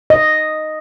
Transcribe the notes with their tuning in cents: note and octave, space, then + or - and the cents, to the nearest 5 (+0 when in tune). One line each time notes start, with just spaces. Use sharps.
D#5 -5